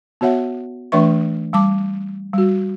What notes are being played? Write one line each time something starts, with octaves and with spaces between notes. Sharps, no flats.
B3 F#4 C#5 E5 F#5
E3 A3 D4 B4 E5 C#6
G3 A5 D6
G3 F#4